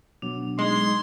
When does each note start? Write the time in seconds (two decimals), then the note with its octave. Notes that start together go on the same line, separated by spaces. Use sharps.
0.22 B2 F#3 B3 D4
0.59 G#3 D#4 G#4 C6